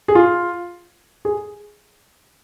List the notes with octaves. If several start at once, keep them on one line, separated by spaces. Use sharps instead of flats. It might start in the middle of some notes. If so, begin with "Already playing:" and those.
G#4
F4
G#4